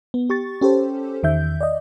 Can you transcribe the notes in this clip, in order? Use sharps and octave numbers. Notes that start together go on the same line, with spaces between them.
B3
G4 C#6 A6
C#4 G4 A4 C5
E2 D#3 E5 G6
D5 D#5